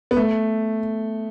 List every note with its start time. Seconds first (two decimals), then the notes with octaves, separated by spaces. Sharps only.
0.11 B3
0.17 A3